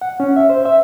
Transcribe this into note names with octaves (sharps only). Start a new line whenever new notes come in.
F#5
C#4
E5
C5
E5